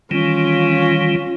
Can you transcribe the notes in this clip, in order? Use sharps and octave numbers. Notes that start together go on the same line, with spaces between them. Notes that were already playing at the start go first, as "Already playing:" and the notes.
D#3 E3 G3 C#4 F4